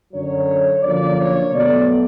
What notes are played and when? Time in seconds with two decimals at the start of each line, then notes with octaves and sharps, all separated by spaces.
0.13 F#2 D3 F#3 C#5
0.82 F#2 D3 F3 A#3 D5
1.18 C#5
1.52 B2 F#3 A3 D5